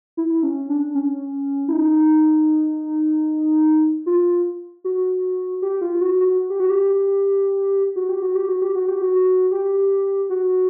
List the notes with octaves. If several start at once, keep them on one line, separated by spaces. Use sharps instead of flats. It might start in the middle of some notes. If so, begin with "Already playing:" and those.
E4
C#4
D4
C#4
E4
D#4
F4
F#4
G4
F4
F#4
F#4
G4
F#4
G4
F#4
G4
F#4
G4
F#4
G4
F#4
G4
F#4
G4
F#4